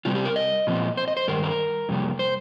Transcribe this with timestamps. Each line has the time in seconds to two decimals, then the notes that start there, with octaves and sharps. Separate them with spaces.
0.05 C3 G3 C4 F4
0.15 G4
0.25 A#4
0.36 D#5
0.67 A#2 F3 C4
0.97 C5
1.08 D#5
1.17 C5
1.28 G2 D#3 A#4
1.43 A#4
1.89 F2 C3 G3 A#3
2.19 C5